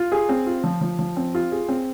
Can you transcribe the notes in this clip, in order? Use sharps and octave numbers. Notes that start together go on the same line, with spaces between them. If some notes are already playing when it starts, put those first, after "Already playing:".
Already playing: F4
G#4
C4
F4
F3
F3
F3
C4
F4
G#4
C4